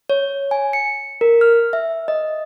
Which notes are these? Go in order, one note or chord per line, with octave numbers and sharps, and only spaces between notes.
C#5
G#5
C#7
A#4
F6
E5
D#5